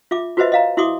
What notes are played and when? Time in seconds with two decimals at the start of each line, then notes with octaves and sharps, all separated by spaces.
0.11 F4 E5 D6
0.37 F4 F#4 B4 C5 D#5 E5
0.52 D#5 F5 A#5
0.77 E4 F#4 E5 C6 D6 D#6